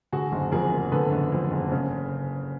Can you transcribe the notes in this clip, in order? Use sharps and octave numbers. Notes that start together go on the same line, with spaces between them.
D3 F#4 G#4
F#1
F2 G#4 A#4
F#1
D3 A4 B4
F#1
F2
F#1
C#3